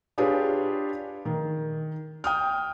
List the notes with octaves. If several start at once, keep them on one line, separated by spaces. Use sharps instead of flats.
D4 F4 G4 G#4 B4 C#5
D#3
G5 D#6 F6